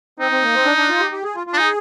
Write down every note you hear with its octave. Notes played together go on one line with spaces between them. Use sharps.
C4 D#4
C4
A#3
C4
D4
D4
F4
G4
G4
G#4
F4
F4
D4
D#4 G#4